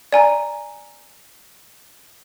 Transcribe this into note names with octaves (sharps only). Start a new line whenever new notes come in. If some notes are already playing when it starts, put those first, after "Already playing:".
D5 G#5 A#5